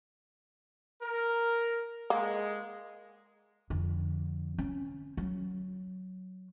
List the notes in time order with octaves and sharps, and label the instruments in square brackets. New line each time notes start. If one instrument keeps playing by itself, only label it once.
[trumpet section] A#4
[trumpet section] G#3 [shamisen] A#3
[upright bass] F2 D3
C#4
F#3